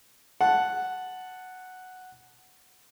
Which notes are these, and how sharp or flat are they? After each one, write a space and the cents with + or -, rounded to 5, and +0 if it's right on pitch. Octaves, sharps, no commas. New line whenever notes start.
F#5 +0 A5 +0